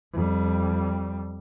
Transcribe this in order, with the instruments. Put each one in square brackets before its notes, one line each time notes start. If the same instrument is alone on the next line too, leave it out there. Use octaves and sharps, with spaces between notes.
[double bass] F2 G3